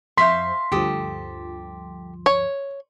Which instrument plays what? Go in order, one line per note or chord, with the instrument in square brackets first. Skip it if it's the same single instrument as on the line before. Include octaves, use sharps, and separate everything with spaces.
[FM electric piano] F2 C5 [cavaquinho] E5 F5 C#6 [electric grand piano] C6 B6
[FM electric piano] D2 G2 F3 [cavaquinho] G4 A4 D#6
[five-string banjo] C#5